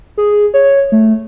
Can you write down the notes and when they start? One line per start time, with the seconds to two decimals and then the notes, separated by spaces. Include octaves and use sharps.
0.17 G#4
0.54 C#5
0.92 A3